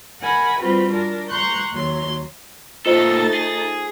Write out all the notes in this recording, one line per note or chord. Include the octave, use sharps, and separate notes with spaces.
A#4 F#5 G#5 B5
G3 C4 F4 F#4 B4
D4 A#4
A#5 C6 C#6 F#6 G6
D#2 F#3 C6
A#2 A3 D#4 F4 A4 C5 D#5 A6
G#4